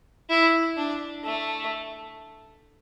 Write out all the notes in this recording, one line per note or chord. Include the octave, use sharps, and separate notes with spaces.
E4
D4
A3